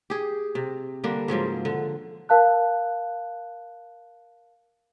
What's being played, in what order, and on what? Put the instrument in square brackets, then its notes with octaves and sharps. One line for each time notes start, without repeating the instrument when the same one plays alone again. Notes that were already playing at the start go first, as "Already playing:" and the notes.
[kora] G4 G#4
C3
D3 G3 A#3 D4
G#2 C#3 F3 F#3
D3
[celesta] A#4 F5 A5 F#6